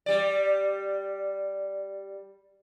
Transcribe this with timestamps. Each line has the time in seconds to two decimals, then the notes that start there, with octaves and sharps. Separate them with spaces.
0.06 G3 D5